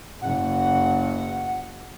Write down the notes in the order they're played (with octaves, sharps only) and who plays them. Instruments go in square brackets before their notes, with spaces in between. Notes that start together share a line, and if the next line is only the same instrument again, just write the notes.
[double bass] F#1 [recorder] F#5